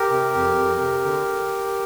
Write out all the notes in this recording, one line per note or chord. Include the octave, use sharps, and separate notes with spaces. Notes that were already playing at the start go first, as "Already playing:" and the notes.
Already playing: G4 A#4
C3
F2
F2
C3
D3